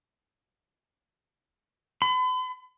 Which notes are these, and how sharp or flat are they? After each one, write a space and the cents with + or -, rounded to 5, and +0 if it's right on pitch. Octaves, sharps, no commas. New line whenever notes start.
B5 +45